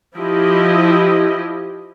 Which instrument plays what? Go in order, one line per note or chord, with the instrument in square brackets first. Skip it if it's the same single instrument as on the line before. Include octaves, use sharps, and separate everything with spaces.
[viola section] F3 E4 G4 D#5